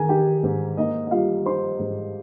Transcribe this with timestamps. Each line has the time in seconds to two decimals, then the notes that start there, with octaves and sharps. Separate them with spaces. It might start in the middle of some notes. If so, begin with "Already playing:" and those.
Already playing: D#3 G#4 A#4 G#5 A#5
0.09 D#4 G4 G5
0.43 G#2
0.77 A#3 D#4 D#5
1.07 D#5
1.11 G3 F4 F5
1.46 D#4 C5 C6
1.79 G#2